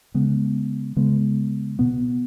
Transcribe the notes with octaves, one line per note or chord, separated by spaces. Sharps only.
C#3 G#3 B3
C#3 G#3 B3
B2 B3